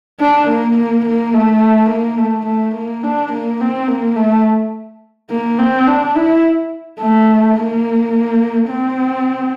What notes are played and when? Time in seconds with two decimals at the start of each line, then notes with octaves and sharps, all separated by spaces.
0.20 D4
0.48 A#3
0.77 A#3
1.06 A#3
1.34 A3
1.89 A#3
2.18 A3
2.46 A3
2.75 A#3
3.03 D4
3.32 A#3
3.60 C4
3.88 A#3
4.16 A3
5.30 A#3
5.58 C4
5.87 D4
6.15 E4
7.00 A3
7.57 A#3
8.70 C4